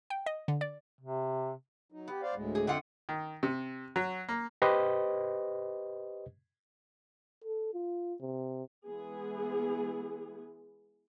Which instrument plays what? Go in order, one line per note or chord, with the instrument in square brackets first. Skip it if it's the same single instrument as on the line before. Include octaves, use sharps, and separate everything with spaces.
[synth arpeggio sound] G5
D#5
D3
D5
[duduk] C3
[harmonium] F#3 D#4
[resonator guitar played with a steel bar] B3 [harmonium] G4
[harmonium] C5 D5 F5
D2 A2 G#3
[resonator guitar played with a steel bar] G#4
[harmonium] F2 D#5 G5 [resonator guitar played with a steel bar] D3 F4 F#5
[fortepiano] D#3
C3
F#3
A#3
[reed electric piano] G4 B4 C5 D#5
[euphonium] A4
F4
C3
[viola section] E3 G#3 B3 G#4